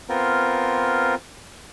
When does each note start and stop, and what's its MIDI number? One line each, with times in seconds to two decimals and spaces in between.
0.09 1.15 59
0.09 1.15 60
0.09 1.15 65
0.09 1.15 70